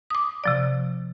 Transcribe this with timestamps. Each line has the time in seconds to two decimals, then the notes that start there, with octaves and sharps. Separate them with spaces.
0.10 D6 D#6
0.44 C3 F3 D5